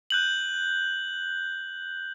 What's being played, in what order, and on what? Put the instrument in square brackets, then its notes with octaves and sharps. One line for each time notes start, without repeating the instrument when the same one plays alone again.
[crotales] F#6 G6 F#7